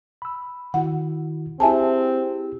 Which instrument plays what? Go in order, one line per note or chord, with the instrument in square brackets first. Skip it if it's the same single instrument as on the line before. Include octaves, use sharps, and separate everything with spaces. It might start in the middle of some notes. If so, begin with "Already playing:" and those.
[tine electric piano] B5 E6
[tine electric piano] D#3 E4 F#4 [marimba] F#5
[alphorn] C4 [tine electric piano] E4 G4 G#4 [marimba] E5 G#5 A5